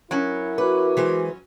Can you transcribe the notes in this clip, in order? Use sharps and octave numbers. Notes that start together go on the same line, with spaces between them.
F#3 C#4 E4 A#4
F#4 B4 D6
E3 G#3 C5